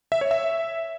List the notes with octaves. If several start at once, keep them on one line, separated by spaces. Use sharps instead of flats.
E5
C#5
E5